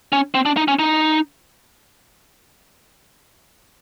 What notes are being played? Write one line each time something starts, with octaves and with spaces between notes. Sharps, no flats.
C#4
C4
D4
D#4
C#4
D#4